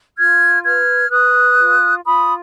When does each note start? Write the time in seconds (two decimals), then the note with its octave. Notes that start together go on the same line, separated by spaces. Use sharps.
0.18 F4 F6 G#6
0.65 B4 F6 G#6
1.11 B4 D#6 F#6
1.59 F4
2.05 F4 B5 D#6